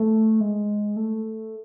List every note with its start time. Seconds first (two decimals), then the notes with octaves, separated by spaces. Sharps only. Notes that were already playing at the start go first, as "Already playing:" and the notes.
Already playing: A3
0.41 G#3
0.97 A3